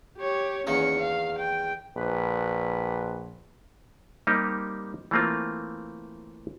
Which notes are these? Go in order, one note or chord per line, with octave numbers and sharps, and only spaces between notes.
G4 C#5
E2 D#3 A#3 C#4 C#7
F5
G5
A#1 B4
G3 A#3 C4 D#4 G4
E3 A3 A#3 C4 F4